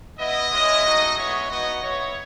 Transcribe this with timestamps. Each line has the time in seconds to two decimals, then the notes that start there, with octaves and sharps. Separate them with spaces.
0.17 B3 E4 D#5
0.50 G#3 C#4 E4
0.83 A3 D#4 F#4
1.16 G#3 B3 E4 C#5
1.49 B3 D#4 F#4 D#5
1.82 B3 E4 C#5